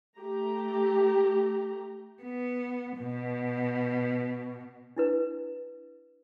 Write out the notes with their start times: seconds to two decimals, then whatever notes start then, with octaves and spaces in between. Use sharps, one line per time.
0.19 A3 G4 A#5
2.23 B3
2.99 B2
4.96 D4 E4 B4